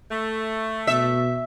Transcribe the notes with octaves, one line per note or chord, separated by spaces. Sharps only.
A3
B2 E5